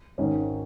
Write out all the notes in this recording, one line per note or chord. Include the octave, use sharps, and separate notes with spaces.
G#1 G#2 D#3 C#4